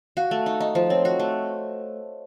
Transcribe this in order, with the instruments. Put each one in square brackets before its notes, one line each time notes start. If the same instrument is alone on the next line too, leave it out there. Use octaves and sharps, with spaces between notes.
[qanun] F#4 [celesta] F5
[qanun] A3
D#4
[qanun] D#4 [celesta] D#5
[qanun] F3 [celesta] C5
[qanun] C4 [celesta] C#5
[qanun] F#4
A3